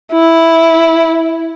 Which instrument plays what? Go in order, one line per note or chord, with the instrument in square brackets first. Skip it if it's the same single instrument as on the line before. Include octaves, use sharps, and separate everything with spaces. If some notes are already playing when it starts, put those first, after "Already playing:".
[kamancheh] E4